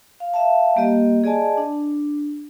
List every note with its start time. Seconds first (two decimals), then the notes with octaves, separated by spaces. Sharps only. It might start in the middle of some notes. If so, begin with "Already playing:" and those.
0.20 F5
0.34 E5 F5 A5
0.76 G3 A#3 G4 D#5
1.24 G#4 D5 D#5 G#5 A5
1.57 D4